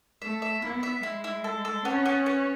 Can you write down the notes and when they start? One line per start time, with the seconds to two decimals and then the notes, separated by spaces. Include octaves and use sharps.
0.22 A3 E5
0.42 E5
0.62 B3 E4
0.83 E5
1.03 G#3 E4
1.24 E4
1.44 A4
1.65 A4
1.85 B3 C#4
2.06 B3
2.26 B3